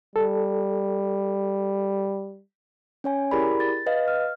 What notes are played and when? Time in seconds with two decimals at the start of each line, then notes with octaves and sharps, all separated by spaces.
0.16 G3 A4
3.04 C#4 C#5 G#5
3.31 E4 G4 G#4 A#4 D5 B5
3.60 A6
3.86 B4 D#5 F5
4.08 F6